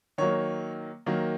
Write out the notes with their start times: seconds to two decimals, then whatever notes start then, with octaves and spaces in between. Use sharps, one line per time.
0.18 D#3 F#3 A#3 C#5
1.06 D#3 F#3 A#3